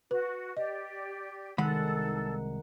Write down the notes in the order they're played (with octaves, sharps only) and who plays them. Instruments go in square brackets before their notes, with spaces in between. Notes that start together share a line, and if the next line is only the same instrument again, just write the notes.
[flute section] F#4 [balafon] B4
[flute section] G4 D5 [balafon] D#5
[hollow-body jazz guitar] C2 G#3 B5 [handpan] D#3 F#5 [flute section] A4